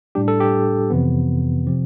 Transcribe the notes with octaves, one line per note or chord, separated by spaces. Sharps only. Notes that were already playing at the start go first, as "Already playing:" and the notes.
A2 G3 D4 G4
A4
G4
F2 C3 E3 B3
C3 F3 C4